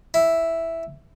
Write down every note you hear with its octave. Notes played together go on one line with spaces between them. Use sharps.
E4